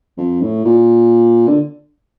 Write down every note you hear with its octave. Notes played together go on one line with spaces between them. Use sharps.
F2
A2
A#2
D3